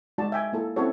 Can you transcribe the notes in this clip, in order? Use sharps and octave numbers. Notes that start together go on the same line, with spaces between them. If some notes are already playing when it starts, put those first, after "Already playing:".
G#3 D#4 F#4 D5 A5
E5 G5 G#5
A#3 E4 A4
C4 C#4 E4 F#4 A4 C#5